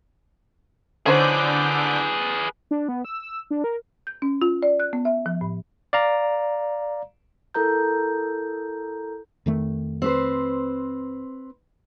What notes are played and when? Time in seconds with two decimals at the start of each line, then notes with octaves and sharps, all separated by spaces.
1.06 D3 C#4 D#4 G#4 B4 C5 D6 G6
2.71 D4
2.88 B3
3.05 E6
3.22 E6
3.51 D4
3.64 A#4
4.07 G6
4.22 C#4
4.42 F4
4.63 D5
4.80 F#6
4.93 B3
5.05 E5
5.26 F3
5.41 A2
5.93 D5 F5 A#5
7.54 E4 A4 A#4 A#5 G6
9.46 F2 D#3 A3
10.02 C4 B4 C5